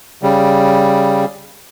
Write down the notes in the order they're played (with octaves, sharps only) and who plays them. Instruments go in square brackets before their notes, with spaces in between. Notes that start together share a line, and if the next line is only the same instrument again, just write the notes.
[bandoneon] C#3 G3